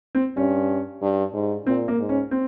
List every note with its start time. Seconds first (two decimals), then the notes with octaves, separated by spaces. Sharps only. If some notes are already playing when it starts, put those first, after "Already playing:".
0.15 C4
0.37 G2 C#4
1.01 G2
1.34 G#2
1.66 A#2 C4
1.88 A#3
1.99 G#2
2.09 C#4
2.31 C4